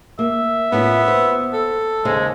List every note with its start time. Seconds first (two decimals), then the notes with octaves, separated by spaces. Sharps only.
0.19 A#3 E5
0.72 A2 B3 C#4 F4
1.08 C5
1.53 A4
2.05 D#2 C#3 G#3 C5